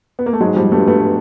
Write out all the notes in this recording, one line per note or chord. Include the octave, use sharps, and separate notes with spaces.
B3
A#3
A3
G#2 F#3 G#3
F3 G3
G2 G3 A3
A3 B3